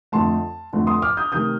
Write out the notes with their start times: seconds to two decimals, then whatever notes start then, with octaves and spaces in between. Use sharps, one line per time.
0.12 F2 D3 A3 A5 C6
0.73 F2 D3 A3
0.87 C6 D#6
1.02 D6 F6
1.17 D#6 G6
1.32 C3 D#3 A3 D#6 G6